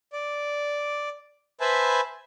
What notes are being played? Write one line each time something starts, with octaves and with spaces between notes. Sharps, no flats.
D5
B4 C5 E5 G#5 A5 B5